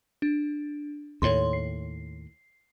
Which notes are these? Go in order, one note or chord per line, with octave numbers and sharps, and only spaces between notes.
D4
D#2 A2 C#5 C6
C7